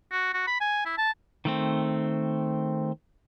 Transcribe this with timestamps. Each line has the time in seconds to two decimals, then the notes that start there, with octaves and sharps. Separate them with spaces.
0.12 F#4
0.34 F#4
0.47 B5
0.61 G#5
0.86 E4
0.98 A5
1.45 D#3 A3 C4